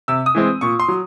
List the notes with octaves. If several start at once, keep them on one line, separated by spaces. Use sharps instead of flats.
C3 E6
D#6
E3 G#3 C4
A#2 C#6
C6
F#3